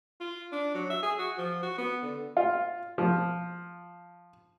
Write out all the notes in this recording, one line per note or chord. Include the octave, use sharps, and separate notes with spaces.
F4
D4
F#3
E5
G#4
F#4
F3
F#4
B3
D3
F4
F3